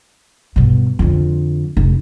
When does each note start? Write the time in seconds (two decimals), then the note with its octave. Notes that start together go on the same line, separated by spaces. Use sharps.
0.56 G2 B2
0.99 F2 D3
1.77 F1 D#4